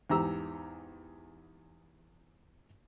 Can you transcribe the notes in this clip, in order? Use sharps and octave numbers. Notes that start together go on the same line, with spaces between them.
E2 G#2 G4 A#5 E6